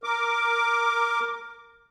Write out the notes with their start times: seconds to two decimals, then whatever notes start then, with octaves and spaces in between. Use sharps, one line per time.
0.03 A#4 D6